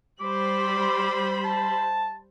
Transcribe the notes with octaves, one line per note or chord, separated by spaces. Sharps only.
G3 C5 B5 D6
A5